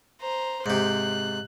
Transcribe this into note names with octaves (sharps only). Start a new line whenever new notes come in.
C5 A#5
G#2 C3 F#6